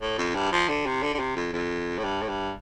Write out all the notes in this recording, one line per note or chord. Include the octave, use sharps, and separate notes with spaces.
A2
F2
G2
F3
D3
C3
D3
D3
C3
F2
F2
A2
G2
A2
G2